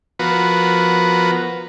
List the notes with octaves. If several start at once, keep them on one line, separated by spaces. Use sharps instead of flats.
F3 B3 F#4 A#4 B4